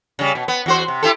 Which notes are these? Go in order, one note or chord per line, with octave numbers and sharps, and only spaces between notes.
C#3 G3
B2
B3
E2 F#4 C5
C3
E4 G4 A4